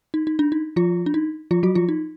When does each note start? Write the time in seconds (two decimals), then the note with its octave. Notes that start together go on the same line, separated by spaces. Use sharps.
0.14 D#4
0.27 D#4
0.39 D4
0.52 D#4
0.76 F3 F4
1.06 D4
1.14 D#4
1.51 F3 F4
1.63 F#3 F#4
1.75 F3 F4
1.89 D#4